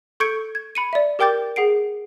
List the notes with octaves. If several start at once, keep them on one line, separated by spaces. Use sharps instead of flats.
A4 C#6 G6 G#6 C#7 D7
G#6
B5 C#7 D#7
D5 E5
G4 A#4 G5 D6 G6 A6
G#4 F#5 C7 D7